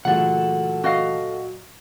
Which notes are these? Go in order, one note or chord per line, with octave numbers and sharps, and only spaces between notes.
A#2 C#3 E3 F#3 A3 A4 F#5
F#4 D#5 F5